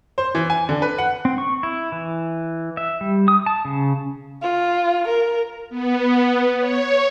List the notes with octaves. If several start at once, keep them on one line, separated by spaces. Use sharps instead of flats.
C5
E3
G#5
D3
B4
F#5
C4
C#6
E4
E3
E5
G3
D#6
A5
C#3
F4
A#4
B3
C#5